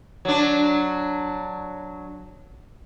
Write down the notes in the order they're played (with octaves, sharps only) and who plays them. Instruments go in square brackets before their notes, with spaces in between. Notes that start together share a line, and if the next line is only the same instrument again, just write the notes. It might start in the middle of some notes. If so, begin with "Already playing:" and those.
[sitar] F#3 D4